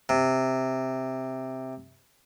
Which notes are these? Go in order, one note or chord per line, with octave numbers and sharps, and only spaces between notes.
C3